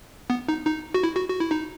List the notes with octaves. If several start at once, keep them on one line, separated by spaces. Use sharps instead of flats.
B3
D#4
D#4
F#4
E4
F#4
F#4
E4
D#4